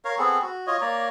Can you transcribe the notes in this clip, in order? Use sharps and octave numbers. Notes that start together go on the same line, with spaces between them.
A#4 C#5 F5
B3 C4 G#4 A4
F#4
F4 C#5 D#5
A#3 C#5 D5 A#5